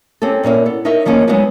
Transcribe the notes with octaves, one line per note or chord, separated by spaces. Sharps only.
C4 C#4 G4 A4
A#2 A#3 C#4 E4
B3 A4
D#4 A#4 C#5 D#5 E5
D#3 F3 A#3 C#4 D#4 G#4
F#3 G#3 B3 D#4 F#4 B4